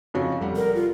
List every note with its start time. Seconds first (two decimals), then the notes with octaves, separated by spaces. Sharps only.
0.14 F2 C#3 F#4
0.40 F1 G3 F#5
0.56 A#4
0.75 F4